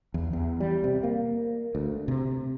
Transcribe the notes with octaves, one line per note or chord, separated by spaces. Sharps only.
E2
E2
G3
C3
A#3
D2
C3